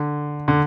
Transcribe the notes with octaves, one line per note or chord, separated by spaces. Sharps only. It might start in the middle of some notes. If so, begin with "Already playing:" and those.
Already playing: D3
D3